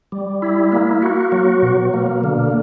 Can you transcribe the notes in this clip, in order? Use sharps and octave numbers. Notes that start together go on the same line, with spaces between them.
G3
E4
A#3
F#4
F#3
B2
A#3
D3